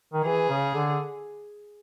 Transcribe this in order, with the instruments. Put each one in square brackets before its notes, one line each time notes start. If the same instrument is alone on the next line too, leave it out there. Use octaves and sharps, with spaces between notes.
[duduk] D#3
[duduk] E3 [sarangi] G#4
[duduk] C#3
D3